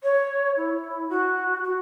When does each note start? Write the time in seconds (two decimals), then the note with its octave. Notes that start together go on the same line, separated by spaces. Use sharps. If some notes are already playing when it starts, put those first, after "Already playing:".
0.03 C#5
0.57 E4
1.09 F#4
1.64 F#4